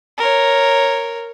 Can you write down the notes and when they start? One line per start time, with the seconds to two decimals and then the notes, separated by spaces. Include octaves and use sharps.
0.18 A#4 C#5